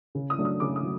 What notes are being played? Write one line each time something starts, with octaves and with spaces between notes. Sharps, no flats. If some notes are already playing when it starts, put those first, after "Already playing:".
C#3
D#6
F#3 A3 D4
D#6
C#3 D6
D#6
F#3